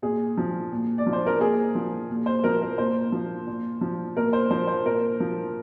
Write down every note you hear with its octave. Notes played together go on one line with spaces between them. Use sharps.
A#2 G#4
F3
A#2
D5
F3
C5
A#4
A#2 G#4
F3
A#2
C5
F3 A#4
A#4
A#2 C5
F3
A#2
F3
A#2 A#4
C5
F3 C5
C5
A#2 A#4
F3